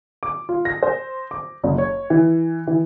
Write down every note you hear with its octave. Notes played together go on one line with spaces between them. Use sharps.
D6
F4
A#6
C5
D6
F#1
C#5
E3
E3